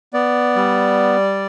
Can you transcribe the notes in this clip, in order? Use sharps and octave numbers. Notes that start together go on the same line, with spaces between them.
B3 D5
G3